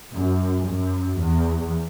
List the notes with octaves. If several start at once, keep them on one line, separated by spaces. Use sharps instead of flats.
F#2
F#2
E2